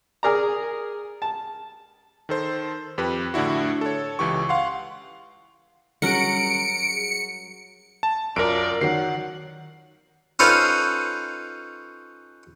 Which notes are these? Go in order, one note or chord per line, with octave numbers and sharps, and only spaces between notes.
G#4 A#4 D5 A#5
A5
D#3 A4 C5
F2 G4 B4
A2 D3 D4 E4 F#4
A4 C#5
C#2 E3 G4 C#6
F5 F#5 C6
F#3 G3 C#4 G#4 A#4 F#5 C#7 D7
A5
F#2 F4 A#4 D5 D7
D#3 F#3 F#5 C7
C#4 D#4 F4 A4 B4 C5